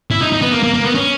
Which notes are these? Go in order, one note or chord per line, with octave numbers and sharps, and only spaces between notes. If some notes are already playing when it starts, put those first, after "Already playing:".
E4
D#4
D#4
B3
A#3
A#3
A#3
B3
C#4